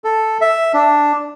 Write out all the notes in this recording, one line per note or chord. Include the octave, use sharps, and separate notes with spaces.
A4
E5
D4